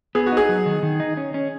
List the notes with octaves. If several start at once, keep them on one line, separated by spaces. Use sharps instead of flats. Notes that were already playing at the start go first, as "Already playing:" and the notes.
B3 G#4
F#4
D#4 G#4
F#3
D#3
D#3
D#4
C#4
C#4